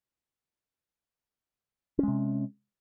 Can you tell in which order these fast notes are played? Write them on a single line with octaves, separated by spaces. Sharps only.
C#4 G#3 C3